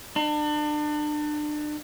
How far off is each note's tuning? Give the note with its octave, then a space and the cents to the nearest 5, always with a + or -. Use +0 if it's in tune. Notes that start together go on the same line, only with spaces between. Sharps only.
D4 +35